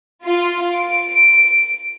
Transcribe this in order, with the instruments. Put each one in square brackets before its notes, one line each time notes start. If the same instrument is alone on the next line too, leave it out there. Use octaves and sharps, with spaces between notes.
[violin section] F4
D7